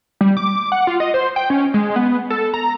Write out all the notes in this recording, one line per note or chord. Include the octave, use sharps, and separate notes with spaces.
G3
D6
F#5
F4
D#5
C5
G5
C#4
G#3
B3
A4
A#5